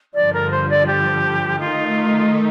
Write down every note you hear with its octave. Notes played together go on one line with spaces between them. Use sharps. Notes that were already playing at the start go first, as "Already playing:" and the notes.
G2 D3 F3 D5
A#4
C5
D5
G4
D#3 A3 D#4 F4